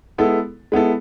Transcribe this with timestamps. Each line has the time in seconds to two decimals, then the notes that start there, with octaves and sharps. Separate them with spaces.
0.18 G#3 B3 E4 A4
0.72 G#3 B3 E4 A4